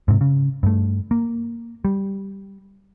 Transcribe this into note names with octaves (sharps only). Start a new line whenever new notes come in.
G#2 C3
C#3
G2 A3
A#3
G3